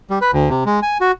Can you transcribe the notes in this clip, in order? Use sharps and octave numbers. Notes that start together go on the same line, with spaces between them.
G3
B4
D2
C3
G#3
G#5
F#4